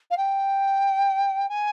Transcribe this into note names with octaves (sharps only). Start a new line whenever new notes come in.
F5
G5
G#5